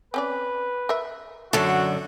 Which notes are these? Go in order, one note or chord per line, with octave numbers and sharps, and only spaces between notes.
C4 C#4 B4 D5
A#4 E5
F#2 D3 F#4 A4 E5